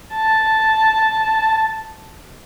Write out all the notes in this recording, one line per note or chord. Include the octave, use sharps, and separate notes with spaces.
A5